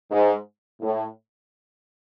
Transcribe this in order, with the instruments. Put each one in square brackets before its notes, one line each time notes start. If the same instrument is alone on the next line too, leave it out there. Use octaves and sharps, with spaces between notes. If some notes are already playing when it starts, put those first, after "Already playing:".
[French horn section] G#2
A2